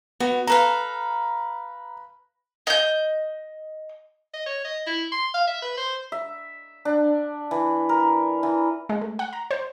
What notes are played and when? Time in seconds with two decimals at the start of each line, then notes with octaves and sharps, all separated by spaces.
0.20 B3 F#4
0.47 A4 B4 F5 A#5
2.67 D#5 G6
4.34 D#5
4.46 C#5
4.65 D#5
4.87 E4
5.12 C6
5.34 F5
5.47 E5
5.62 B4
5.77 C5
6.12 E5
6.85 D4
7.51 E3
7.89 A#4
8.43 E3
8.89 G#3
9.01 A3
9.19 F#5
9.33 A#5
9.51 C5